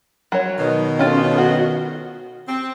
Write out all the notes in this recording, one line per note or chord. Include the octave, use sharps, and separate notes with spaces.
F#3 C#5
B2 D#3
C#4 F4 A4
F#4
C4